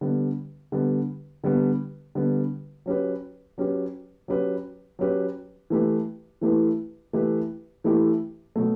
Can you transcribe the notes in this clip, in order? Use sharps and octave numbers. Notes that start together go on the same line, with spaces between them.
D3 G3 B3
D3 G3 B3
D3 G3 B3
D3 G3 B3
F#3 C#4 G4 B4
F#3 C#4 G4 B4
F#3 C#4 G4 B4
F#3 C#4 G4 B4
E3 A3 E4 G4 B4
E3 A3 E4 G4 B4
E3 A3 E4 G4 B4
E3 A3 E4 G4 B4
B2 F#3 A3